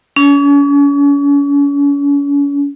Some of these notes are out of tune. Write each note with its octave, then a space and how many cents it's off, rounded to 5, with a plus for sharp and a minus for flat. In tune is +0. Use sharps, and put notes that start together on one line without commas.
C#4 +40